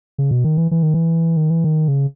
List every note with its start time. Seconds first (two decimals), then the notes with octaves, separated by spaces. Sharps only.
0.18 C#3
0.31 B2
0.44 D#3
0.57 E3
0.71 E3
0.83 D#3
0.94 E3
1.37 D#3
1.50 E3
1.64 D#3
1.88 C#3